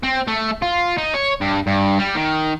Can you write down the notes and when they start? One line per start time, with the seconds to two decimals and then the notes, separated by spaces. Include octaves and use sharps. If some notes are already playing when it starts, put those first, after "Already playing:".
0.03 C4
0.27 A3
0.62 F4
0.98 D#4
1.14 C#5
1.41 G2
1.67 G2
1.99 G3
2.15 D#3